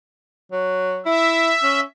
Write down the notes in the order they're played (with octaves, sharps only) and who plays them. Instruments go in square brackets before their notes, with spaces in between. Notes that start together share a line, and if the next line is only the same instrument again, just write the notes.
[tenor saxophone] F#3
[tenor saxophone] E4 [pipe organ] E5
[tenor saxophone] C#4